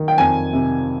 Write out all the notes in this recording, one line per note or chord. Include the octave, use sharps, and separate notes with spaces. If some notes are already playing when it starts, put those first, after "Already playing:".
Already playing: D#3
G5
F2 G#5
C3